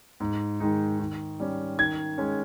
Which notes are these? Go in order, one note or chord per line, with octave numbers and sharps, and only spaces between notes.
G#2
D#3 G#3 D#4
D#3
G3 C#4
D#3 G#6
G#3 C#4